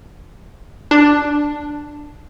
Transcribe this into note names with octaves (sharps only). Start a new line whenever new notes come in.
D4